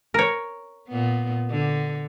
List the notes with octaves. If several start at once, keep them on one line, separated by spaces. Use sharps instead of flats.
A#4 C#5
A#2 B3
D3